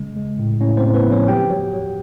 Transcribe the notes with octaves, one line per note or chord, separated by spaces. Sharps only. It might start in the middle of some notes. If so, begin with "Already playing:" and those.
Already playing: C#3 G#3
G#3
A2
A2 C#4 C#5
C4 C5
A2
B3 B4
F3
C#4 C#5
F#3 G4 G5
F#3
F#3